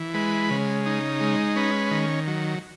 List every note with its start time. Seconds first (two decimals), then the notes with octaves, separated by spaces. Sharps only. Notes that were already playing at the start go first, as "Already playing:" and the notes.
Already playing: E3
0.14 G#3 B4
0.51 C#3
0.86 D#4
1.21 G#3
1.56 C#4 B4
1.91 D#3
2.28 F#3